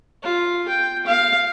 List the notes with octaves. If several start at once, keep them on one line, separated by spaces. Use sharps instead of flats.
F4
G5
F5